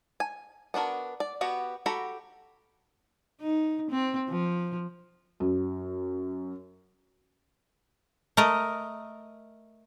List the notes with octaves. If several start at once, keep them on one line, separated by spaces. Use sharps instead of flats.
G#5
B3 D4 F#4 A#4
D5
B3 F#4 G4
F#4 G4 A4 A#5 B5
D#4
C4
F3
F#2
A3 A#4 D#5